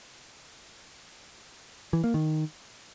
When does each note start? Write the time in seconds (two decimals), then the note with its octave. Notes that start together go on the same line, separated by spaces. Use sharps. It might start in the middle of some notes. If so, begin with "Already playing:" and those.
1.93 E3
2.04 A#3
2.14 D#3